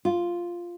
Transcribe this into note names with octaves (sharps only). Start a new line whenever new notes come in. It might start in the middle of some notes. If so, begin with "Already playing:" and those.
F4